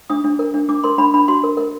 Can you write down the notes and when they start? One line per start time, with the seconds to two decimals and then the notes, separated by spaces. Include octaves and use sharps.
0.10 D4 D#6
0.24 D4
0.39 A#4
0.54 D4
0.69 D4 D6
0.84 A#4 C6
0.98 D4 B5
1.14 D4 B5
1.28 F#4 C6
1.44 A#4
1.57 A#4